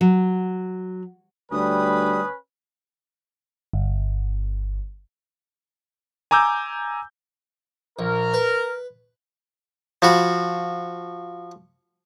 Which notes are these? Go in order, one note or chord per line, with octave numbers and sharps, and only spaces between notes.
F#3
D2 G3 C#4 B4 D#6
G1
G#5 A#5 D6 E6 G6
A#1 A#4
B4
F3 F#4 B5